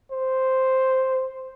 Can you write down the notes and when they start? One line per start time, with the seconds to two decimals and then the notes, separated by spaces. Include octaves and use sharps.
0.11 C5